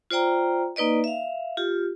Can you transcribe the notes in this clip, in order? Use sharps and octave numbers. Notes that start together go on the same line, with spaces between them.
F4 C5 D5 G5 A#5
A#3 D#4 B4 D5 D#5
E5 F5
F4 G4